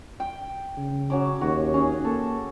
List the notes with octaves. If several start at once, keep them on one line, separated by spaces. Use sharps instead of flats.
G5
C#3
F#3 C#4 D6
D#2 F#4
C#4 G#4
A#3 A4